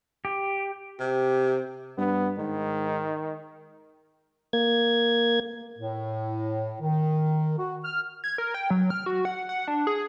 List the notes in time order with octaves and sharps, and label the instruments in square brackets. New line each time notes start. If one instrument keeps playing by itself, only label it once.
[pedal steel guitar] G4
[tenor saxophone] C3 [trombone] G4
[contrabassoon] G2 [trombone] B3
[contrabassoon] G#2 [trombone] D#3
[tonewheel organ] A#3 G#6
[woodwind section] A2
D#3
F#4
F6
[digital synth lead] G#6
A#4
G5
F#3
F6
F#4
F#5
F#5
D4
G#4